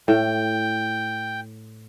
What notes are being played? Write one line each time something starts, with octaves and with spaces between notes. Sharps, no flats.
A2 G5